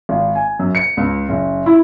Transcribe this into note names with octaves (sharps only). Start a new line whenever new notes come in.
G#1
G#5
F#2
C#7
C#2
F#1
E4